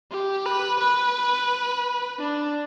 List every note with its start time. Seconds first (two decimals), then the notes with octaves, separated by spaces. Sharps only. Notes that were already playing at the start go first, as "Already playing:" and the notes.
0.11 G4
0.46 B4
0.80 B4
2.19 D4